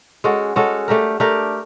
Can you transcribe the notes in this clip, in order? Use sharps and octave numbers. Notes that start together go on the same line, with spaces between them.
G#3 C#4 F#4 A4
G#3 C#4 F#4 A4
A3 D4 G4 A#4
A3 D4 G4 A#4